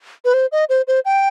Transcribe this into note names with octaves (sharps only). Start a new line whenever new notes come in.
B4
C5
D#5
C5
C5
G5